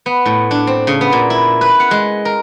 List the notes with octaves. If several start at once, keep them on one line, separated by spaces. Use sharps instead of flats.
B3
A2
D4
C4
C#3
B3
A#2
E4
B4
F#5
G#3
A#4